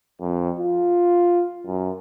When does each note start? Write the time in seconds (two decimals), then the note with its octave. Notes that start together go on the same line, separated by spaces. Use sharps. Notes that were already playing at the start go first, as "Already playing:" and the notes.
0.20 F2
0.60 F4
1.67 F#2